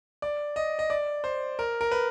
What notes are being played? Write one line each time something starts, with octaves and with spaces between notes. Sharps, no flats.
D5
D#5
D#5
D5
C5
A#4
A#4
B4